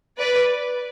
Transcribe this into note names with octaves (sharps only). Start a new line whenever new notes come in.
B4 D5